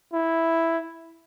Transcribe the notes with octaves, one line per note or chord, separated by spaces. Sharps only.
E4